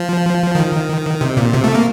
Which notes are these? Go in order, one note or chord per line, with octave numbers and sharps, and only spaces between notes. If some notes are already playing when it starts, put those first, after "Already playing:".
Already playing: F3
D#3
C3
A#2
C3
A3
A#3